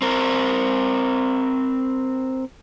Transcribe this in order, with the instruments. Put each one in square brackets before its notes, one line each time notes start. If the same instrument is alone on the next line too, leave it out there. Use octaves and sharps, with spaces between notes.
[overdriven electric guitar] C4 A#4